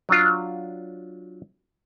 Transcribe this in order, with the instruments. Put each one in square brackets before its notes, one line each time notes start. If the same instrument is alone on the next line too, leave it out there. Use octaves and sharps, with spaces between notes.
[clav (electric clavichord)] F#3 D4 F4